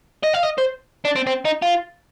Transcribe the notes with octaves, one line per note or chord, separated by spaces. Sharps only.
D#5
F5
D#5
C5
D4
C4
C4
D#4
F4